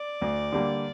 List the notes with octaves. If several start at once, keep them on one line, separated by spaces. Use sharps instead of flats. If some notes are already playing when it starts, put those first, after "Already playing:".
Already playing: D5
D2
D3 G3 A#3